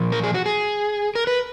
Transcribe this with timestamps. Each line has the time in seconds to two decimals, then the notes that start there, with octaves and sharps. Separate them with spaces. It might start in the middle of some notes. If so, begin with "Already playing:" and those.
Already playing: A#2 F3
0.12 A#4
0.23 G#4
0.34 F#4
0.46 G#4
1.15 A#4
1.27 B4